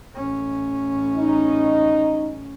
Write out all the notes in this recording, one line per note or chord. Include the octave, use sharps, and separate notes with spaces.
A1 C#4
D#4